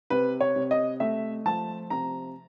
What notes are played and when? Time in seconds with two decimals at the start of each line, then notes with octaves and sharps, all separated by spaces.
0.10 C3 B4
0.41 C#5
0.56 C3
0.71 D#5
1.00 A3 E5
1.46 F3 A5
1.90 C3 A#5